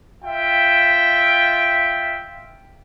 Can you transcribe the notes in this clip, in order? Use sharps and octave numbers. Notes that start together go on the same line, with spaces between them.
F4 E5 G5